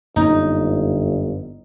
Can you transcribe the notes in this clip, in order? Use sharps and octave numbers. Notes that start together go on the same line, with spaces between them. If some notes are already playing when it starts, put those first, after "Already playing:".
G1 F#2 A#3 C#4 D#4